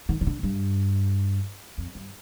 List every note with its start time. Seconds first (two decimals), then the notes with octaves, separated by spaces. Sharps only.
0.09 D#3
0.21 D#3
0.27 D3
0.43 G2
1.78 F2
1.95 G2